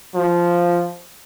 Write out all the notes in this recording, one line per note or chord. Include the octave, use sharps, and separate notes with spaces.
F3